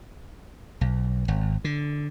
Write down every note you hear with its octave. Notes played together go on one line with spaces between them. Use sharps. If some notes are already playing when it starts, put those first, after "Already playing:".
B1
G#1
D3